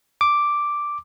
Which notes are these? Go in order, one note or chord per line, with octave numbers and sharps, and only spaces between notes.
D6